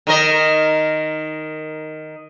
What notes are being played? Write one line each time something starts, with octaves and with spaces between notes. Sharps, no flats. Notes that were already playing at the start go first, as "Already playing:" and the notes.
D#3 A#4 D#5